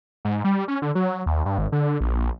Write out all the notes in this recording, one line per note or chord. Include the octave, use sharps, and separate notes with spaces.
G#2
G3
C#4
D3
F#3
D#2
G2
G#1
D3
A#1